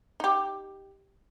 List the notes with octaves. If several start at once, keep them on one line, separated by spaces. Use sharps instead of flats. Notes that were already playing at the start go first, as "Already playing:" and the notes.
D#4 G4